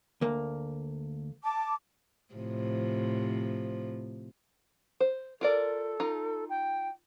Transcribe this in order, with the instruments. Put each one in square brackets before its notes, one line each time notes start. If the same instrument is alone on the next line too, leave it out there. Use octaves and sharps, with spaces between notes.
[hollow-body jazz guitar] D2 A#3
[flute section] A5 D6
[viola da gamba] A2 C3 F3
[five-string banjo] C5
[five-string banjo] F4 A#4 D5 [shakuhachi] A4
[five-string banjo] D#4 F4
[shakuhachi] G5